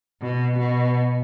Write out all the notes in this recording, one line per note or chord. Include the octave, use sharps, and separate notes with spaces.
B2
B2